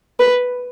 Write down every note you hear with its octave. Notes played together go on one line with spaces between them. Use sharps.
B4